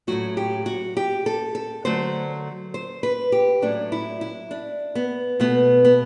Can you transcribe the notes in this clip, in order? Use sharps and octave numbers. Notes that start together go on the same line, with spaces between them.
A2 F#3 A3 F#4
G4
F#4
G4
A4
A4
D3 F#3 A3 C5
C5
B4
G4
A2 F#3 A3 D4
E4
E4
D4
B3
B2 A3 B3
B3